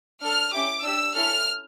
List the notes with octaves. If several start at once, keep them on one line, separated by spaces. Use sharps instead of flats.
D4 A4 F6
C#4 E4 G4 D6
D4 G4 E6
C#4 E4 A4 F6